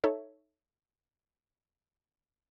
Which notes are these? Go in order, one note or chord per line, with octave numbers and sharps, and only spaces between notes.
D#4 A4 C#5 E5